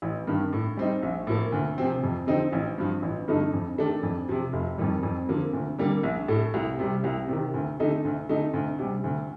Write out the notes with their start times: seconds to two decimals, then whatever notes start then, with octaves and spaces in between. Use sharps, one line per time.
0.02 A1
0.27 G2 D#3
0.53 A2
0.77 G3 C4 D#4
1.03 A#1
1.27 A2 F3 A#3
1.52 D2
1.78 C3 F3 C4
2.03 F2
2.27 D3 F3 C4 D#4
2.53 A1
2.78 G2 F3
3.02 A1
3.28 G2 D3 A3 D#4
3.53 F2
3.78 D#3 A3 D4
4.03 F2
4.29 C3 F3
4.53 F1
4.78 F2 D#3 G3
5.03 F2
5.29 D3 F3 A#3
5.53 D2
5.79 D3 G3 A#3
6.03 A#1
6.28 A2 A3
6.54 C2
6.79 C3 G3
7.04 C2
7.28 C3 D#3
7.54 D2
7.80 D3 A3 D#4
8.05 D2
8.29 D3 A3 D#4
8.54 D2
8.79 C3 G3
9.04 D2